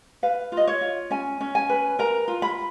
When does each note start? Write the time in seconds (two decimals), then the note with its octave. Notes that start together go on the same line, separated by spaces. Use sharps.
0.23 B4 F5
0.52 F4
0.57 D#5
0.67 C#5
0.81 F4
1.10 C#4 G#5
1.41 C#4
1.55 G#5
1.69 B4
1.99 A#4 A#5
2.28 F4
2.42 B5